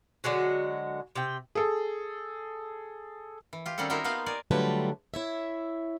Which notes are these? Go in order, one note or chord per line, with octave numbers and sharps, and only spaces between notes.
D3 F#3 G#3 F#4
C3 G5
G#4 A4
E3
F4 G4
D#3 G3 C4 C#4 F#4 A4
D#4 E4 F#4 G4 A#4 C5
A#3 B3 F4 F5
A#4 D5 G#5
D3 F#3 G3 A3 F4 B4
E4 C#5 E5